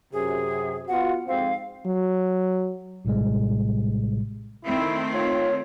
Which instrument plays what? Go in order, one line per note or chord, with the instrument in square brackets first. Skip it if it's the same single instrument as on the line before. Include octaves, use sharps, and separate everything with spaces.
[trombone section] F#2 C3 [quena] G#4
[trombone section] B3 F4 F#4 [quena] F#5
[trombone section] F2 G#2 C4 [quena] F5
[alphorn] F#3
[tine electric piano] A#1 A2 C3 G3 G#3
[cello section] D#3 A3 C4 [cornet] E4
[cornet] F4 [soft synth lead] C#5